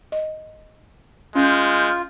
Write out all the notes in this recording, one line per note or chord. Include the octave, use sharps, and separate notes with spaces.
D#5
G#3 C#4 F4 F6 G6